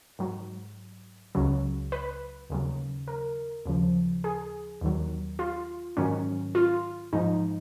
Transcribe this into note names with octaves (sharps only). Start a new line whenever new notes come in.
G#2 F#3
C#2 C#3 F#3
B4
D#2 C#3 F#3
A#4
D#2 C#3 F3
G#4
D#2 D#3 F#3
F4
G#2 D#3 F#3 C#4
F4
G#2 F3 D#4